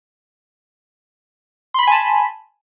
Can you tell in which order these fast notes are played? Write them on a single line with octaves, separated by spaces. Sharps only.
C6 B5 B6 G#5 A5